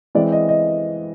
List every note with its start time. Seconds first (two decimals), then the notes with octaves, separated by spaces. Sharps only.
0.15 E3 G#3 C4 D5
0.32 D#5
0.49 D#5